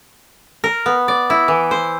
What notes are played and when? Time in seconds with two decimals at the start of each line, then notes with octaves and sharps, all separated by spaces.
0.64 A#4
0.86 B3
1.08 D5
1.30 E4
1.48 E3
1.71 C5